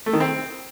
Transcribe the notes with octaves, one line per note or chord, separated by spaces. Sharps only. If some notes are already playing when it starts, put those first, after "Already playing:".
A3
D#3
C4